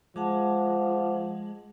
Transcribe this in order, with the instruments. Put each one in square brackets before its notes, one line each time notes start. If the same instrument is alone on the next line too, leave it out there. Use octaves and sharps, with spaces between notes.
[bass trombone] F3 [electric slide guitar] G#3 [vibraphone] F#5 A5 D6